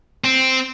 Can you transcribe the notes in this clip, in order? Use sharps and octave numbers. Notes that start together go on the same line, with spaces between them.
C4